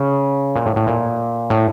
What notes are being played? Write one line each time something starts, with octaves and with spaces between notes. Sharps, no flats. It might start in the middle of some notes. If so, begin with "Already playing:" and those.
Already playing: C#3
A#2
A2
A2
A#2
A2